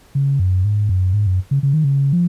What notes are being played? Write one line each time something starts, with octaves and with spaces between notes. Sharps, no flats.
C#3
F#2
G#2
F#2
G#2
F#2
C#3
C#3
D#3
C#3
F3